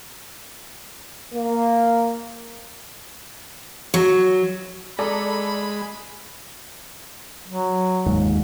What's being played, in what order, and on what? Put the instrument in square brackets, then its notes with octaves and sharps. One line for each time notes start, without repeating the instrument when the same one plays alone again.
[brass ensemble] A#3
[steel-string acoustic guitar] F#3
[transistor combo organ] G#3 [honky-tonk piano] A4 D5 A#5 [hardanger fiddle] B5
[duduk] F#3
[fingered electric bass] F1 D#2 G#2